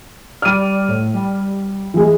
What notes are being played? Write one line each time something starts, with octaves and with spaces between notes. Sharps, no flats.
G3 D5 F6 D#7
A2
G3
E3 G#3